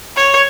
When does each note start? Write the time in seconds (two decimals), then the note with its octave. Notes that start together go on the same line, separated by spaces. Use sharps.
0.16 C#5